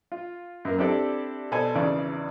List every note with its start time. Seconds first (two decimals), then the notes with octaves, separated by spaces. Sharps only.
0.12 F4
0.65 F#2 A#3
0.78 C4 D4 E4 G4 A4 D5
1.52 B2 A4 C5 D5 G#5
1.75 G#1 E2 C#3 D5